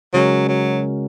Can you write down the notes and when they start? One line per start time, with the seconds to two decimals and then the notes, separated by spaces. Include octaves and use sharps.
0.14 C#3 F#3 G#3 C#4 F#4 A#4
0.49 F#3